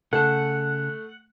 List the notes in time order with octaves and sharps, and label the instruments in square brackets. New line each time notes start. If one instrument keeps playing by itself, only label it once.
[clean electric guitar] C#3 A5 [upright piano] A3 [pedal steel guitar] F#5